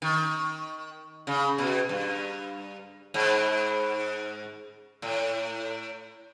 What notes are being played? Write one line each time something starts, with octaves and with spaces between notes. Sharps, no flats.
D#3
C#3
B2
G2
G#2
A2